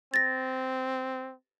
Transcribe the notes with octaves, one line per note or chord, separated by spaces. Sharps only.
C4 A6 A#6